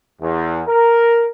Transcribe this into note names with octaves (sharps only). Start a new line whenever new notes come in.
E2
A#4